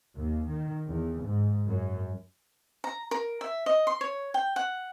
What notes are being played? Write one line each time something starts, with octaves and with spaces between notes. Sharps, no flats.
D#2
D#3
E2
G#2
F#2
A#5
A#4
E5
D#5
C6
C#5
G5
F#5